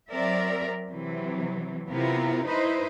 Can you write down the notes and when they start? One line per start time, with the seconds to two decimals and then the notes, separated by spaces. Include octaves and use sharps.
0.11 F#3 C4 A#4 D5 E5
0.89 C3 E3 F#3
1.90 C3 B3 E4 F4 A#4
2.45 D#4 E4 B4 C5 D#5